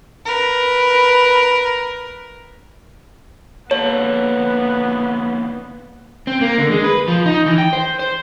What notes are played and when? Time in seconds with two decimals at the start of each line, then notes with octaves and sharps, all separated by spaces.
0.24 A#4 B4
3.71 D3 A#3 B3 C#5 A5
6.27 C4
6.41 A#3
6.58 D3
6.71 G#3
6.84 B4
7.08 F3
7.26 D#4
7.46 E3
7.58 G5
7.73 C5
7.99 C5